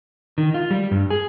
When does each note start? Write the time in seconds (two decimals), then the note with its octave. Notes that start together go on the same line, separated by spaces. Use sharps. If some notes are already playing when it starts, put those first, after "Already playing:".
0.38 D#3
0.54 F4
0.71 G3
0.91 G2
1.10 G#4